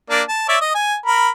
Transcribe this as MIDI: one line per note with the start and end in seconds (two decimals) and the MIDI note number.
0.10 0.22 58
0.10 0.22 62
0.10 0.22 74
0.29 0.47 81
0.49 0.57 73
0.49 0.57 74
0.49 0.57 76
0.61 0.74 75
0.74 0.95 80
1.06 1.29 70
1.06 1.29 83